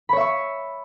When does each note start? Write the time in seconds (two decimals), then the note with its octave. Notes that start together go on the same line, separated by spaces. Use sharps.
0.09 B5
0.13 C#5
0.17 E5
0.20 C#6